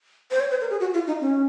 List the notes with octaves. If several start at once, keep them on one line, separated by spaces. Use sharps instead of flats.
C5
C#5
C5
A#4
G#4
F#4
F4
D#4
C#4